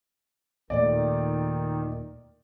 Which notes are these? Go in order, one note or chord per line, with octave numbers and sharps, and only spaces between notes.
D#2 A#2 D#3 A3 D5